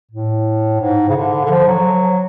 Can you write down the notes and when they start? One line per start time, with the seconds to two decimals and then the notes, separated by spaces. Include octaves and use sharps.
0.11 A2
0.80 G#2
1.09 C#3
1.16 D3
1.45 D3
1.50 F3
1.67 F#3